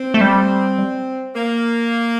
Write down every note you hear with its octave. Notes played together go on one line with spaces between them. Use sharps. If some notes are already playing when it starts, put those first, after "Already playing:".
Already playing: C4
A3
G3
A#3